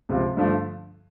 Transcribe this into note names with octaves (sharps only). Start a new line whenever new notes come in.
C#2 C3 F3
G2 D3 F3 A3